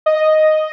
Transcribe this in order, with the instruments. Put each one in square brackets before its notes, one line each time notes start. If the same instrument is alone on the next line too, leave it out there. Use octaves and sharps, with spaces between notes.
[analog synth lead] D#5